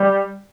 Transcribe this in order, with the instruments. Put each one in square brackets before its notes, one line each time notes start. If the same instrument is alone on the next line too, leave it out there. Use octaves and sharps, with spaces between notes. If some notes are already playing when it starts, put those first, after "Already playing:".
Already playing: [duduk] G3